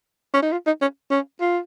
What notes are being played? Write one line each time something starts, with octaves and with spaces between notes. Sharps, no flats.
C#4
D#4
F4
D#4
C#4
C#4
F4